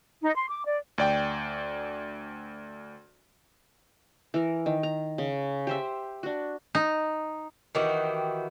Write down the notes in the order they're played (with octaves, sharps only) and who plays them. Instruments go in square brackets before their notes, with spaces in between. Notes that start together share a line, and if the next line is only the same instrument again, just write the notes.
[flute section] D#4
C6
D6
D5
[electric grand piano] D2 D5 G5
[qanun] E3 A#4
D#3
A#5
C#3
G4 C5 E5
D4 F#4
[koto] D#4
[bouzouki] D#3 E3 F#4 G4